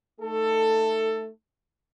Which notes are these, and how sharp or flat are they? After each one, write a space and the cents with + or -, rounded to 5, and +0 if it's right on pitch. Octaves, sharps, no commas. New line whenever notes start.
A3 +0 D#4 +0 A4 +15